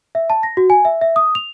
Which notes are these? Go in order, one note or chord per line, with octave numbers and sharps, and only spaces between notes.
E5
A5
A#6
F#4
G#5
E5
E5
D#6
F7